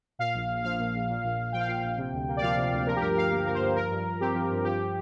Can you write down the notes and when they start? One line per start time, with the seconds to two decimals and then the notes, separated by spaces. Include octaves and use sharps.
0.19 A#2 F5
0.35 A#1
0.49 A#1
0.64 F3 F5
0.79 A#2
0.94 A#1
1.09 A#2
1.23 A#1
1.38 A#1
1.52 F3 G5
1.60 F5
1.67 A#2 G5
1.83 A#1
1.97 C3
2.13 D2
2.27 A#3
2.37 D5
2.42 F3 F5
2.57 C3
2.72 D2
2.87 F3 A#4
2.96 G4
3.01 G2 A#4
3.16 G2 F5
3.31 A#3
3.46 F3 A#4
3.54 C5
3.61 G2
3.75 F3 A#4
3.90 G2
4.05 G2
4.20 C4 G4
4.35 F3
4.51 G2
4.64 F3 G4